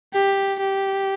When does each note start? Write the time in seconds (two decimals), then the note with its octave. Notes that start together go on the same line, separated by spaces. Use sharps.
0.13 G4
0.59 G4